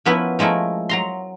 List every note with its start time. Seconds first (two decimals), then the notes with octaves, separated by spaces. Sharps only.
0.05 F3 A#3 B3 C#4 E4 B4
0.39 F3 G#3 A3 E4 A#4
0.89 F#3 A#5 C6